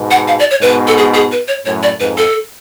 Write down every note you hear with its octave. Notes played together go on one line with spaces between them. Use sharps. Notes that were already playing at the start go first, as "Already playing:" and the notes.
Already playing: G#2 B2
F#5
F5
D5
C#5
G#2 B2 B4
A4
G#4
G#4
B4
C#5
F#2 A2 C#5
D5
F2 G#2 B4
A4